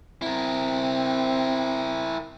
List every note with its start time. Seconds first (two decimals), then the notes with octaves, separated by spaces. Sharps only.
0.22 C4 E4 A#4